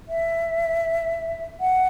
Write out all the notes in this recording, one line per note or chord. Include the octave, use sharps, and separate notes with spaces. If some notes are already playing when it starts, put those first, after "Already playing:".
E5
F#5